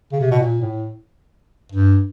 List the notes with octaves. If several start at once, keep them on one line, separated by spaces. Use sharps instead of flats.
C#3
C3
B2
A#2
A2
G2